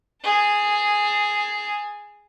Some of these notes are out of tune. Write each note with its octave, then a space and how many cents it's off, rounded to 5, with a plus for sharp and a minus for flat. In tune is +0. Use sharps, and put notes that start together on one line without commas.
G#4 +0 A5 +25